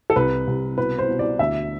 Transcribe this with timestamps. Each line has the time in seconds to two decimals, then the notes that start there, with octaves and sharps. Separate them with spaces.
0.10 A4
0.16 C2 B4
0.47 C2
0.78 B2 B4
0.99 C5
1.08 B2
1.19 D5
1.39 D2 E5